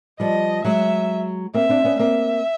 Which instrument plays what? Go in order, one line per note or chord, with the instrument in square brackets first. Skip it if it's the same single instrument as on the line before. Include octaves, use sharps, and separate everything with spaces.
[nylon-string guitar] F3 G3 [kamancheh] D#5
[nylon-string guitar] F#3 G#3 [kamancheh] E5
[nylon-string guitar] A#3 C4 [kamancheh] E5
[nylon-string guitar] C4 D4
B3 C#4
[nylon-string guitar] A#3 C4 [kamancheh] E5